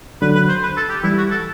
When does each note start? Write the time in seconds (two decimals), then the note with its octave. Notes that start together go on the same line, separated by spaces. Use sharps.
0.22 D3 F#3 B4
0.35 B4
0.49 C5
0.63 B4
0.77 A4
0.89 G4
1.03 E3 G3 E4
1.18 F#4
1.31 A4